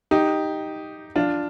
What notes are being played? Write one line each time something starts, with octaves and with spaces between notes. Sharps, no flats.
D#4 G4
D4 F4